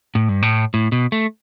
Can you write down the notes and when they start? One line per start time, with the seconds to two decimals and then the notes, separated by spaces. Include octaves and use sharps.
0.15 A2
0.29 G2
0.42 A2
0.74 A2
0.92 B2
1.12 A3